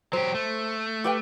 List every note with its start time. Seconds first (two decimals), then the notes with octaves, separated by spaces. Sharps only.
0.13 F#3 G4 C5
0.34 A3
1.04 G4 B4 G5